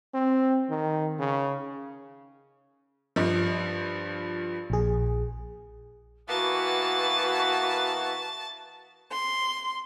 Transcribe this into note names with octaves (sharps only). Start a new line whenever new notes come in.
C4
D#3
C#3
G2 F3
A#1 G#4
E3 A#3 B3 F#4 B4 A5
C6